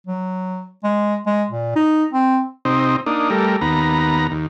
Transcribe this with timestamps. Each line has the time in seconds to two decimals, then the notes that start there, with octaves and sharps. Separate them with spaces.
0.07 F#3
0.84 G#3
1.26 G#3
1.50 A#2
1.76 D#4
2.13 C4
2.65 C3 C4 D#4
3.06 A#3 D4 D#4
3.30 G3 A3 A#4
3.61 D#2 B3 A#5
4.31 D#2